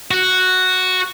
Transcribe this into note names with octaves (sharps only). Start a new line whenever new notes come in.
F#4